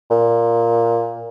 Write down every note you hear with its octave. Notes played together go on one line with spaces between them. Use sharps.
A#2